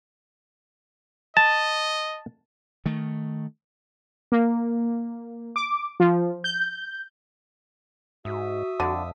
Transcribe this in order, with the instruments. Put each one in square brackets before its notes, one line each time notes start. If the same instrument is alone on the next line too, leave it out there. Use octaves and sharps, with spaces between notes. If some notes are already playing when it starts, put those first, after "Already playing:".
[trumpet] D#5 [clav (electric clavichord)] A5
[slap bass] D#3 A3
[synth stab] A#3
D6
F3
G6
[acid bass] G#2 [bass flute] F#4 [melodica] E5 D#6
[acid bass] F2 [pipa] D3